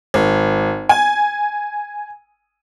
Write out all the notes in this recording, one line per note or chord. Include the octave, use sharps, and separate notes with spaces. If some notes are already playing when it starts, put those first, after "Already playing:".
G#1
G#5